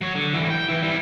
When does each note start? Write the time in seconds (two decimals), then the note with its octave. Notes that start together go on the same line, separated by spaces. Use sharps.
0.01 F#3 C#5
0.15 D3
0.33 E3 G3
0.50 G5
0.69 E3 E4
0.83 G3 E4